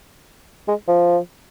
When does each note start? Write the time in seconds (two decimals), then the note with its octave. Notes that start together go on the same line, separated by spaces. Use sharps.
0.68 G#3
0.88 F3